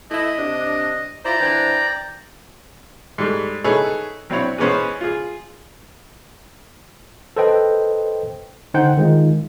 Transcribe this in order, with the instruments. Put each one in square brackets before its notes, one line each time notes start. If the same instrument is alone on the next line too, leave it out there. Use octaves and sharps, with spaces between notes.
[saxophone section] A3 E4 [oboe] D#5
[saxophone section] C3 D4
[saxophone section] E4 F4 C5 [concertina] D5 A#5
[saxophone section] E3 D4 C5 [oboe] G5
[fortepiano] G#2 G3 A3
D#4 E4 G#4 A4 B4 C#5
F#3 C4 D4 E4 C#5
E3 G#3 B3 C#4 B4 C5
F4 G#4
[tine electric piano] A4 B4 C5 D#5 G5
D3 D#4 C5 F#5 G5 G6
D#3 G#3 D#4 F4